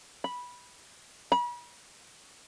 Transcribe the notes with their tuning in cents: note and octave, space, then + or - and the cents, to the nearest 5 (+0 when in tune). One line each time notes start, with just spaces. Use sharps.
B5 -10
B5 -40